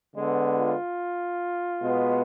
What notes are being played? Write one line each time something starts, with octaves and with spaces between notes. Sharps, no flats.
D3 G#3 B3
F4
B2 G#3 B3